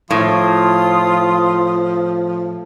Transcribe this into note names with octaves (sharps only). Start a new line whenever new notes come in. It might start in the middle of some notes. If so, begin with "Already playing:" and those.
A2 F3 F4 D#6